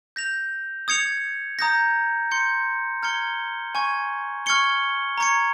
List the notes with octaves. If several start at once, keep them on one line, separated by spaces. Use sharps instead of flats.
G6 A#6 F7
D#6 G#6 C#7 F7
A#5 D#6 G6 A#6
C6 G6 C#7
A#5 F6 G#6 C#7 G7
G#5 C#6 G#6
C#6 F6 G#6 C#7 G7
A#5 C#6 G#6 C#7